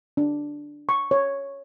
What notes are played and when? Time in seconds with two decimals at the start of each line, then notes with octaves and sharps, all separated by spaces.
0.17 D4
0.89 C#6
1.11 C#5